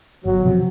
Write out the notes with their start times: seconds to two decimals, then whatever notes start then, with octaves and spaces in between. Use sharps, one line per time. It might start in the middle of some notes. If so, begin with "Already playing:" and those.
0.25 G1 F#3
0.43 C3 F3